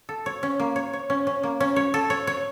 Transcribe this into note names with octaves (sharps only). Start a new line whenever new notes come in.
A4
C#5
C#4
A#3
C#5
C#5
C#4
C#4
A#3
C#4
C#5
A4
C#5
C#5